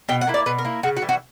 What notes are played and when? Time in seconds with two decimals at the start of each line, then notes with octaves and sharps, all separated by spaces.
0.09 B2 G5
0.21 F#5
0.27 A#3 E4
0.34 D5
0.46 B2 B4
0.58 A#4
0.65 A#3 E4
0.83 C#3 F#4
0.97 F#4
1.02 E3 G3
1.09 F#4